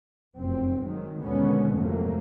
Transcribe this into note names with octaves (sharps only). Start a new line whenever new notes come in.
F1 F#2 C4
D#3 F#3 G#3
D#2 B2 D3 G#3 B3 C#4
F2 G#2 C3 F#3 A3 A#3